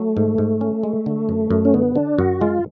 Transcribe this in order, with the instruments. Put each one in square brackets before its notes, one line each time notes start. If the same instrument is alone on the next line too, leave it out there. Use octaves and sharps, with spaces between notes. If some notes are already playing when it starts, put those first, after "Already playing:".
Already playing: [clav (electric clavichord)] F#3 [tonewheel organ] A3
[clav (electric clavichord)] G#2
G#2
C#4
G#3
D3
F#2
F#2
[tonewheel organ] C#4
[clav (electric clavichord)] D3 [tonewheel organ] B3
[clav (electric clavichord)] D3 [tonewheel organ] D4
[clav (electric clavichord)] F#2 [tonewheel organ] F#4
[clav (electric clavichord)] G#3 [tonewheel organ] F4